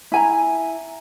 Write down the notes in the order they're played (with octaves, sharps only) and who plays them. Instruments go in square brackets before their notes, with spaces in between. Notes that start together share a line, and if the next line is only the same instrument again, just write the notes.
[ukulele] E4 G#5 A#5